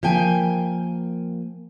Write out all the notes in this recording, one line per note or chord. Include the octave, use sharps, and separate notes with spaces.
F3 A#3 G5 G#5